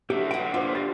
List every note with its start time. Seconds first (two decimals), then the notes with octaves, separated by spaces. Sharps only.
0.10 D3 F#3 A3 G4
0.31 D3 B4 F#5 G5
0.54 F4 C5 D6
0.75 G4 A6 A#6